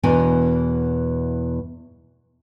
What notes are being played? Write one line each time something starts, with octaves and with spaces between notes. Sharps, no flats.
E2 B2 E3 D4 A#4 G#5